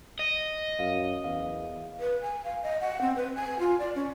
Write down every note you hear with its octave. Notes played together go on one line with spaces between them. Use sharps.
D#5
F#2 F5
E2 F5
B4
G#5
F5
D#5
F#5
C4
B4
G#5
F4
D5
C#4